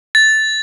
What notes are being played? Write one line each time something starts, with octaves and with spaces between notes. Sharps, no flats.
A6